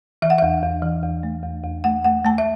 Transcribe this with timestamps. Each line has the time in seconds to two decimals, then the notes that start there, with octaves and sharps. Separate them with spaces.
0.22 E3 E5
0.30 F#5
0.38 E2 E5
0.63 E2
0.82 E3
1.03 E2
1.23 A3
1.43 E2
1.64 E2
1.84 A3 F#5
2.04 A3 F#5
2.25 A3 A5
2.38 E5